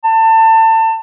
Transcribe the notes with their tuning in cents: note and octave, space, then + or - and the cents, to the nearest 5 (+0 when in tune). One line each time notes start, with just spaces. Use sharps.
A5 +30